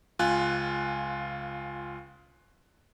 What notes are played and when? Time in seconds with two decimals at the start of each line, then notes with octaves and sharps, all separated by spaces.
0.19 C#2 F4 G#5 F#6